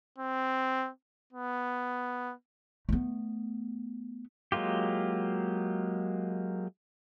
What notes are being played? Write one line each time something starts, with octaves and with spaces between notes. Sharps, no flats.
C4
B3
A3 B3
F#3 G#3 A#3 F4 G4